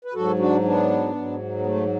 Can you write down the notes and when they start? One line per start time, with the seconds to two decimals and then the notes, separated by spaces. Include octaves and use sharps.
0.05 B4
0.14 G#2 F#3 F#4 A4
0.39 D4 F#4
0.64 B3 D4
1.15 G#2 F#3
1.59 B3
1.66 A3